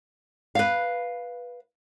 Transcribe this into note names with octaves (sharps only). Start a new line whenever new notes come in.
B4 F5